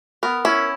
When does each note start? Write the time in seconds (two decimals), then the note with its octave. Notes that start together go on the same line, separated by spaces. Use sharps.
0.23 B3 A#4
0.45 C#4 E4